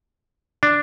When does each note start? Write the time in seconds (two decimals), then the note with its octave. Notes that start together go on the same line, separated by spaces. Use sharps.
0.63 D4